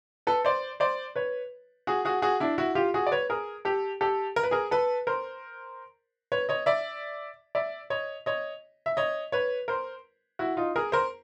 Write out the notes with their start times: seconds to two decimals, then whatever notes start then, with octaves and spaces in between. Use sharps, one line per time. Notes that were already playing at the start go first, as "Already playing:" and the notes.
0.27 A4 B4
0.45 C5 D5
0.80 C5 D5
1.16 B4 C#5
1.87 F#4 G#4
2.05 F#4 G#4
2.22 F#4 G#4
2.40 D4 E4
2.58 E4 F#4
2.75 F4 G4
2.94 F#4 G#4
3.07 D5
3.12 B4 C#5
3.30 G#4 A#4
3.65 G4 A4
4.01 G4 A4
4.36 A#4
4.43 B4
4.51 G#4 A#4
4.71 A4 B4
5.07 A#4 C5
6.32 B4 C#5
6.49 C#5 D#5
6.66 D5 E5
7.55 D5 E5
7.90 C#5 D#5
8.26 C#5 D#5
8.86 E5
8.97 C#5 D#5
9.32 B4 C#5
9.68 A#4 C5
10.39 E4 F#4
10.57 D#4 F4
10.76 G#4 A#4
10.92 A#4 C5